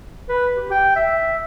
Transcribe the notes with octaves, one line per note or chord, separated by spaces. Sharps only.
B4
G4
G5
E5